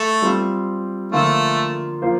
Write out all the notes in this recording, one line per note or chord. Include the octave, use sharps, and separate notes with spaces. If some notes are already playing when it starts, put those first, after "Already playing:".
Already playing: A3 A4
G3 C4 F4 C5
D3 F3 A3 A#3 F4 A4
F3 A#3 F4 C5